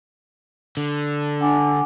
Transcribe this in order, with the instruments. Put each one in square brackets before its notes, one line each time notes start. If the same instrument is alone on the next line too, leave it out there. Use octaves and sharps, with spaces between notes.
[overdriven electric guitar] D3
[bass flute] D4 [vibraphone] F#5 G#5 D6